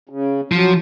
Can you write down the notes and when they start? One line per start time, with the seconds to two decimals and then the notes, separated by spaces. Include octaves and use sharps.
0.09 C#3
0.52 F3 F#3